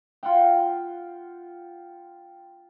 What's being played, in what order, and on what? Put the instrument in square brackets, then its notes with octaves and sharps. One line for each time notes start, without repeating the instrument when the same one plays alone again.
[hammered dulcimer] F4 F#5 G5